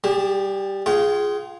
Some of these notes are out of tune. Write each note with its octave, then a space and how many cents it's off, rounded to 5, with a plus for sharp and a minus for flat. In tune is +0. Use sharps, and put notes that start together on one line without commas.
G3 -5 G#4 -35 A5 +0
F4 +0 G#4 +0 G5 -40